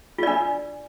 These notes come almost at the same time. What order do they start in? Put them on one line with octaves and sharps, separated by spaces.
F4 D5 D4